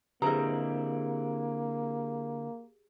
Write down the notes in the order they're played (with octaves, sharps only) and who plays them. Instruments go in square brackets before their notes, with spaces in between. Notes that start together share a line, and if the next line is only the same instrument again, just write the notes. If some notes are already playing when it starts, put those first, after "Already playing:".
[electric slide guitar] D3 C4 E4 [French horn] A#3 [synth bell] G4 G#4 [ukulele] D#5 A#5